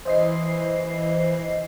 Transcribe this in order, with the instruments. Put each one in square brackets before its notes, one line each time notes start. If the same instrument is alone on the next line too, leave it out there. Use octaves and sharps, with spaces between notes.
[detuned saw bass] E3 [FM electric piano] C5 D#5 C7